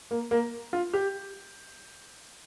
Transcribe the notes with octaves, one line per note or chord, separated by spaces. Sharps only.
A#3
A#3
F4
G4